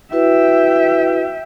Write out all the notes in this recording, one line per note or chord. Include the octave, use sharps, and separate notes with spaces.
E4 F#4 B4 E5 G5